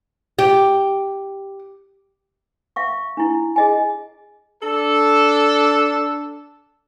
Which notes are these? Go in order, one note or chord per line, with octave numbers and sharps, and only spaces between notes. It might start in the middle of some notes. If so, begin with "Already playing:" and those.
G4
E5 F5 C#6
D4 E4
G#4 D#5 G#5
D4 A4